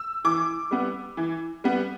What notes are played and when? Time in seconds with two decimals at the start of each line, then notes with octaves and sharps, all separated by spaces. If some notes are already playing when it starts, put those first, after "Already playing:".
Already playing: E6
0.24 E3 D6
0.71 G3 B3
1.17 E3
1.64 G3 B3